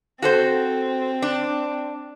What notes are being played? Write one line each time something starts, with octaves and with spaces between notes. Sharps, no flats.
C4 F#4 A4 C5
D4